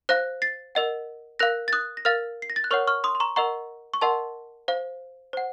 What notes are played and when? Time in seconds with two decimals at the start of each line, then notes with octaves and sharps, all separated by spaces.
0.09 C5 F5 F#6 A#6
0.42 A6 C7
0.75 A#4 D#5 F#5
1.39 A#4 F5 F#6 A#6
1.68 A6
1.73 D#6 F#6
1.97 A#6
2.05 A#4 F5 F6 A6
2.42 C7
2.50 A#6
2.56 A6
2.64 F#6
2.71 A#4 C#5 F#5 C#6 F6
2.87 C#6 F6
3.04 C6 D#6
3.15 C6
3.20 A#5 C#6
3.36 A#4 D#5 F#5 A#5 C#6
3.94 C#6
4.01 A#4 D#5 F#5 A5 C6
4.68 C5 F5
5.33 C5 F#5